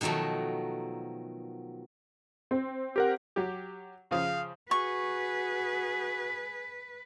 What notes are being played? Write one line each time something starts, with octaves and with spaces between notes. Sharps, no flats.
B2 D#3 F3 F#3 A3
C4
G4 A#4 F#5
F#3 G4
C#3 F3 G#4 F5
F#4 G#4 B4 C#6